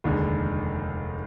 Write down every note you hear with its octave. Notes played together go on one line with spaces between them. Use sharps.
F1 D#2 D3 G#3